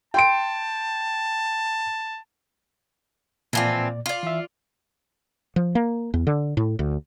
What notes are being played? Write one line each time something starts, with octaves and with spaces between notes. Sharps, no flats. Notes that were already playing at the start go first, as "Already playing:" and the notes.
G5 A5 C6 D7
A#2 E3 F3 C4 D5
F4 D5
E3 E5
F3
A#3
E2
D3
A2
D2